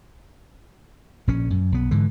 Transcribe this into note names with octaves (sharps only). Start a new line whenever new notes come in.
A#1 C#4
F#2
B1 B3
G#2 D3 E3